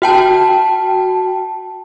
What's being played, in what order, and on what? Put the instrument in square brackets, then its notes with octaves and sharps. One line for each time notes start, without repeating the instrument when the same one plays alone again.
[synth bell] F#4 G5 A5